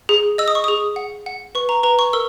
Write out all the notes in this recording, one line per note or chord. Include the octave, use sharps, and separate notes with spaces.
G#4
D#5 E6
D#6
C#6
G#4 D#6
F#5
F#5
B4 C#6
A#5
B4 A#5
C#6
A#4 E6